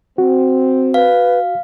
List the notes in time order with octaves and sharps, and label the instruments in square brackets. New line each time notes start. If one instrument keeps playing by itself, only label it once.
[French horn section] C4 [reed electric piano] F#4
[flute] B4 [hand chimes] F5